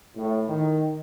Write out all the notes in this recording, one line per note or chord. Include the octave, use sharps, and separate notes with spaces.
A2
D#3